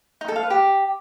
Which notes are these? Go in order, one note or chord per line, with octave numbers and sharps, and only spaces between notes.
D#4
A4
F5
B4
G4